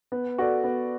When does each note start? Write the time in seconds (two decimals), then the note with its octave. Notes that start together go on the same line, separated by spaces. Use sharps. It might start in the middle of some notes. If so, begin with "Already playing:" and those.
0.12 B3
0.38 F#4 A4 D5
0.64 B3